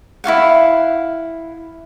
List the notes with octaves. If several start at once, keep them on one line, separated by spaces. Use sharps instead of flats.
E4 F#4 F5 F#5